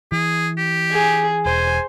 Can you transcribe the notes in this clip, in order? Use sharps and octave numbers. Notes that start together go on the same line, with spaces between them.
E3 G#4
G4
G#4
E1 C5 G#5